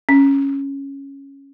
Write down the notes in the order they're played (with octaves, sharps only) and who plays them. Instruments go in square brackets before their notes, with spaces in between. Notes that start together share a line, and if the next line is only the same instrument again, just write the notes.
[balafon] C#4